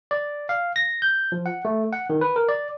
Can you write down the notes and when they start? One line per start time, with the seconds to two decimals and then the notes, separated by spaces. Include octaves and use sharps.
0.11 D5
0.49 F5
0.76 A#6
1.02 G6
1.32 F3
1.46 F#5
1.65 A3
1.93 F#5
2.10 D#3
2.21 B4
2.36 A#4
2.49 D5